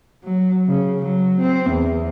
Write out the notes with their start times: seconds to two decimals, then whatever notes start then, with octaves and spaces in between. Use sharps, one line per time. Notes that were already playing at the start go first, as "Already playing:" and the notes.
0.24 F#3
0.68 C#3
1.00 F#3
1.41 C4
1.70 E2